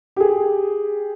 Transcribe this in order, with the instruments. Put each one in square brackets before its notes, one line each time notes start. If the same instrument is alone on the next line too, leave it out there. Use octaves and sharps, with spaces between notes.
[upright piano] G4 G#4